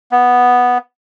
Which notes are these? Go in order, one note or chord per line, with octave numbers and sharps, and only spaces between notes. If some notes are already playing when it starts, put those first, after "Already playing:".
B3